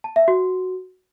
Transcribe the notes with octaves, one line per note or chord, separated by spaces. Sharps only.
A5
E5
F#4